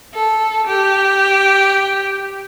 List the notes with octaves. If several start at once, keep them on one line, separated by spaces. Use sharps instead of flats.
A4
G4